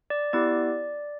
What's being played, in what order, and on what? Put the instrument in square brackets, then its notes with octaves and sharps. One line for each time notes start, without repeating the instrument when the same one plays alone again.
[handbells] D5
B3 E4 G4 D5